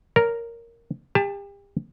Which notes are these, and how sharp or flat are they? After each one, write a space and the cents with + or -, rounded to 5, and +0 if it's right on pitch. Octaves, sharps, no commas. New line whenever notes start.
A#4 -5 C#5 +20
G4 +35 A5 +0